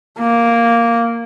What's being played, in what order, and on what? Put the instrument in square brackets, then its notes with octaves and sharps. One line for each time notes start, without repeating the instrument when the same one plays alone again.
[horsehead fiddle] A#3